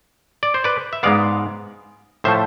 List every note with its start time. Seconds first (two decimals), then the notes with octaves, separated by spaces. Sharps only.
0.43 D5
0.54 C5
0.64 B4 D5
0.93 E5
1.03 G#2 G#3 B3 D5 F5
2.24 A2 F3 A3 C5 E5